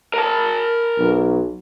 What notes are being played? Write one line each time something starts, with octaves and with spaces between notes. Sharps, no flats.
A#4 A5
B1